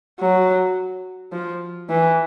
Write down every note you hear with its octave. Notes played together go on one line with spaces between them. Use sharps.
F#3
F3
E3